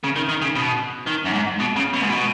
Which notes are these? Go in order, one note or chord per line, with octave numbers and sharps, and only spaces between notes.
C#3
D#3
D#3
C#3
B2
D#3
F#2
G#2
B2
C#3
B2
G#2
B2